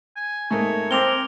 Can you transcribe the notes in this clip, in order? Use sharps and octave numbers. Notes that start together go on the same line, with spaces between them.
G#5
G#2 A3 A#3 C#5
C4 A#4 D6 F7 G7